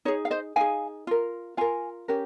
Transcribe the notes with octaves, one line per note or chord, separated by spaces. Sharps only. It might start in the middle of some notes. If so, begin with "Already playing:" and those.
D#4 G#4 C#5
F5
C5 D#5
D#4 G#4 F5 G#5
F4 A#4
F4 A#4 F5 G#5
C#4 G4 A#4